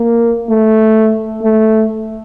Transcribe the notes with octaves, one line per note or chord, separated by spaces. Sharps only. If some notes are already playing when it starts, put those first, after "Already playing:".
Already playing: A#3
A3
A3